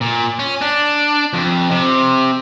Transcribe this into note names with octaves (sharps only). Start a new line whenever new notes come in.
A#2
C#4
D4
F2
C3